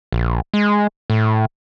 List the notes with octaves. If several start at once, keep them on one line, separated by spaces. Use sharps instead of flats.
A#1
G#3
A2